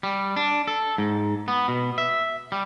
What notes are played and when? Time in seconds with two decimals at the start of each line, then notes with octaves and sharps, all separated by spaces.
0.03 G3
0.36 D4
0.67 A4
0.98 G#2
1.48 B3
1.68 B2
1.98 E5
2.52 G3